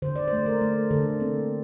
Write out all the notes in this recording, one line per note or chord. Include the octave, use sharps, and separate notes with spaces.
D3 C5
D5
C5
A3
A#4
A3
D3 A4
A#3 C4